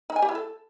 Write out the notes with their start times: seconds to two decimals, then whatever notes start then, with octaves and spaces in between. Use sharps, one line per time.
0.10 D#4
0.16 G#5
0.22 G4
0.29 E4
0.35 A4